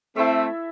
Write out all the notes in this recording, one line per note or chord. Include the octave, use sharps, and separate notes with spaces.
A3 C4 E4 A4 E5